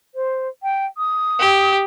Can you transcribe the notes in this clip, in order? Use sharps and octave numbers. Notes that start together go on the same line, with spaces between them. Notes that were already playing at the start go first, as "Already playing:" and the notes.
C5
G5
D#6
G4